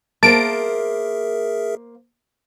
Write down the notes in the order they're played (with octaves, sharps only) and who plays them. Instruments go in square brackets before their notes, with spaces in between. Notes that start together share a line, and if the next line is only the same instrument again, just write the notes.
[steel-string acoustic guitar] A#3 C5 [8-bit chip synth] G#4 A#4 E5 [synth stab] A5 D7